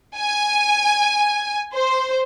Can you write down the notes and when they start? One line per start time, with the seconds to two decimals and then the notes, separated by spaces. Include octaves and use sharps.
0.17 G#5
1.73 C5